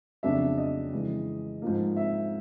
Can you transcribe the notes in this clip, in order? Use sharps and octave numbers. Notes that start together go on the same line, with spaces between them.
F2 C#3 F#3 B3 D4 E5
D#5
F2 C#3 E3 G#3
G#2 F3 A#3
E5